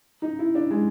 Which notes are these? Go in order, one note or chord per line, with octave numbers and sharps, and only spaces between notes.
D#4
E4
D4
G#3